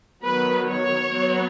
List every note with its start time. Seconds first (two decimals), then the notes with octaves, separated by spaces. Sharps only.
0.25 D#3 F#3 B3 B4
0.68 C#5
1.11 F#3 B3